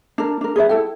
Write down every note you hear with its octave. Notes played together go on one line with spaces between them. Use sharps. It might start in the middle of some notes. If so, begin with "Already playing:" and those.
D4 A#4
D4 A#4
G#4 B4 C#5 E5
E4 A4 G5